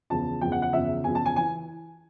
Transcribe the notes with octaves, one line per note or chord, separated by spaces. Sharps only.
E2 C#3 F3 A5
E2 C#3 F3 G5
F#5
F#5
E2 C#3 F3 E5
E2 C#3 F3 G#5
A5
G#5
E3 G#5